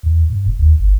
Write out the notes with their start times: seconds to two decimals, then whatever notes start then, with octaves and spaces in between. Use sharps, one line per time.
0.03 E2
0.30 G2
0.46 E1
0.59 D#2
0.79 G1